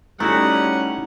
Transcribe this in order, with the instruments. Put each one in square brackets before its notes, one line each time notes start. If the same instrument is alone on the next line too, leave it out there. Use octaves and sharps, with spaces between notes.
[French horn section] G3 C#4 [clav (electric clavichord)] A3 E4 F#4 [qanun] D#4 [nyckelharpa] F#5